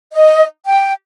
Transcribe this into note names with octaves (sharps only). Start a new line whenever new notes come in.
D#5
G5